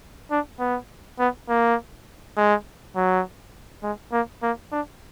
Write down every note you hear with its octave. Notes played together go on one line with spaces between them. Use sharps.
D4
B3
B3
A#3
G#3
F#3
G#3
A#3
A#3
D4